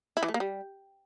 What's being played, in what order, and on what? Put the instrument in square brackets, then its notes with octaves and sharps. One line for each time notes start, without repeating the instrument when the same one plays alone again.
[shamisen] E4
E3
A3
A#3
G3